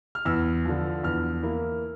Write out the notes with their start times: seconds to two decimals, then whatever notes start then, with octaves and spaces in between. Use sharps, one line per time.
0.15 F6
0.25 E2 E6
0.65 D3 F3
1.03 E2 F6
1.42 E3 A#3 E4